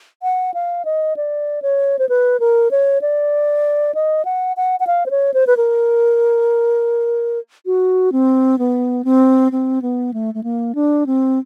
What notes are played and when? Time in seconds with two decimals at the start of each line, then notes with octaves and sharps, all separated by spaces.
0.23 F#5
0.54 F5
0.85 D#5
1.17 D5
1.62 C#5
1.99 C5
2.09 B4
2.40 A#4
2.71 C#5
3.02 D5
3.95 D#5
4.25 F#5
4.57 F#5
4.80 F#5
4.87 F5
5.06 C5
5.11 C#5
5.34 C5
5.47 B4
5.57 A#4
7.66 F#4
8.12 C4
8.59 B3
9.05 C4
9.52 C4
9.82 B3
10.14 A3
10.34 A3
10.43 A#3
10.75 D4
11.06 C4